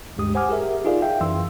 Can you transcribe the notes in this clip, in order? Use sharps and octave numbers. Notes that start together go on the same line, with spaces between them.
G#1 D2 G2 G#3 G4 D#6
C5 F#5 G#5 D6 F6
G4 G#4 A#4 E5
D#4 F4 G#4 A#4 D5 F5
E5 F5 G5
F#2 E3 C6 E6